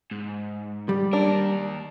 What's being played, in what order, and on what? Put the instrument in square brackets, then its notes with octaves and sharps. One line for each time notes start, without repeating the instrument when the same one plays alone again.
[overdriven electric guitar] G#2
[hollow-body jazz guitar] G3
[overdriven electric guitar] D#2 A#4 [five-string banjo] D4